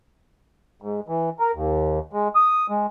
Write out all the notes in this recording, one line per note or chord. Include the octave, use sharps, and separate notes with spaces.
G#2
E3
A#4
D#2
G#3
D#6
G#3